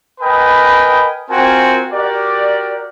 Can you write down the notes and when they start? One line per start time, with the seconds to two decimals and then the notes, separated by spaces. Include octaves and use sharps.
0.21 A#4 B4 D#5 G5 G#5 B5
1.31 C4 F4 F#4 A#4 G5 G#5
1.93 F#4 G4 A#4 D5